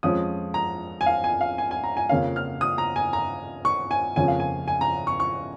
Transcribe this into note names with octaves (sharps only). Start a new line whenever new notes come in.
F2 F3 G#3 C#4 D#6
A#5
G#5
F5
G#5
F5
G#5
G#5
A#5
G#5
F2 C#3 A#3 C#4 F5
F6
D#6
A#5
G#5
A#5
C#6
G#5
F2 C#3 F3 A#3 C#4 G#5
F5
G#5
G#5
A#5
C#6
C#6